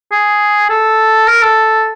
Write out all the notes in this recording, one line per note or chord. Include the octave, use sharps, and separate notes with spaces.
G#4
A4
A#4
A4